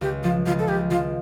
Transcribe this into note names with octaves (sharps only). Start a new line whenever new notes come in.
C#2 G4
F3 F4
C#2 F4
A4
C#2 G4
F3 F4